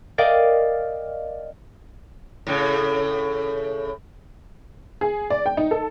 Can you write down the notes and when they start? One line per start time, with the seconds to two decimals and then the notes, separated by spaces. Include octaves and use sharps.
0.18 A#4 D5 D#5 F5 G5
2.47 A2 C#3
5.01 G#4
5.30 D5
5.46 G5
5.57 D#4
5.71 A4